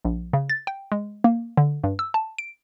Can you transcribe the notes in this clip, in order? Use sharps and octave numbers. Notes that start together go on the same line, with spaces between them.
A#1
C#3
A6
G5
G#3
A#3
D3
G2
E6
A5
D7